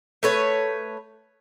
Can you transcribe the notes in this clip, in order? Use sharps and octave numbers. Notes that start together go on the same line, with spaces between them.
A3 B4 C#5